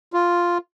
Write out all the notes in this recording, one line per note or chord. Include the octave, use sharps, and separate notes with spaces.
F4